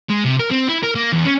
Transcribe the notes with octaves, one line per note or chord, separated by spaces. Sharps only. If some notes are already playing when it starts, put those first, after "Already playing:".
G#3
C3
A#4
C4
E4
A#4
A#3
E2
C#4